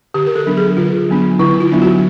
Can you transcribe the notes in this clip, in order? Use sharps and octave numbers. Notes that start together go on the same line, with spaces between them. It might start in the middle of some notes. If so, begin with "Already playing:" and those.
D3 G4
A#4
A4
F#3 B3 D4
G#4
D3 F4
F#3 B3 D4
D3 E4
F4
F#3 B3 D4
F#4